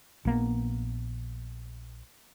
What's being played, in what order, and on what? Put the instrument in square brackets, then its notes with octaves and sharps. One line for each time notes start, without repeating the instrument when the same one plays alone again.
[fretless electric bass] A#1 A#3 B3